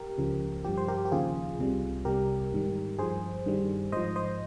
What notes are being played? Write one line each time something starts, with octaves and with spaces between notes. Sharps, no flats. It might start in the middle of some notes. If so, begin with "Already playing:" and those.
Already playing: G4 A#4
C#2 C#3 F3
G2 F3 G4
C5
G4 A#4
G4
D#2 C#3 F3 F4 G#4
C2 C3 G3
C2 C3 G3 G4 A#4
G#2 D#3 G3
G2 F3 G#4 C5
G2 D#3 G3
G#2 F3 C5 D#5
C5 D#5